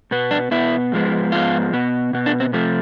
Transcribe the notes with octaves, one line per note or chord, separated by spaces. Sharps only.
B2 B3
D4
B2 B3 E4
G#2 F3 G#3 B3
G#2 F3 G#3 B3 F4
B2 B3
B2 B3
D4
C4
C3 F3 A3